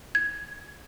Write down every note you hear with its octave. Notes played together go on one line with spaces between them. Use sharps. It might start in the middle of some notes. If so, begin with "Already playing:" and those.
G#6